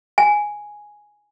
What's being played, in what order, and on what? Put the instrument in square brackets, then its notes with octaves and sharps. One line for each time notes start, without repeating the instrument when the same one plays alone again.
[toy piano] G#5